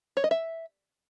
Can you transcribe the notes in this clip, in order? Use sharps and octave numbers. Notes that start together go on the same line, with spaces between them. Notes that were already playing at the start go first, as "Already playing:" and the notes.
C#5
D#5
E5